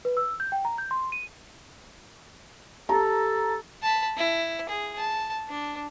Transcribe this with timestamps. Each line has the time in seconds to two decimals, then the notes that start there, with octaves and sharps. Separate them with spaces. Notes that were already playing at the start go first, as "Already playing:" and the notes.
0.05 B4
0.17 E6
0.40 G6
0.52 G5
0.65 A#5
0.78 G6
0.91 C6
1.12 D#7
2.89 G4 A4 A5 A#5
3.82 A5 B5
4.17 E4
4.69 G#4
4.97 A5
5.49 D4